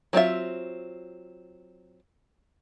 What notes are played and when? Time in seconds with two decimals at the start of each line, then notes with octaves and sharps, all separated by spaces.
0.13 F#3 C4 F4 E5